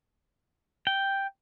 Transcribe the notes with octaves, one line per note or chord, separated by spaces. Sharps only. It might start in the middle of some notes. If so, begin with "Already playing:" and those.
G5